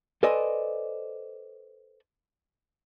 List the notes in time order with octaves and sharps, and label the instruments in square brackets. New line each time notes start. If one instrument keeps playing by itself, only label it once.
[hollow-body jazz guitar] A4 B4 C5 D5 D#5 G#5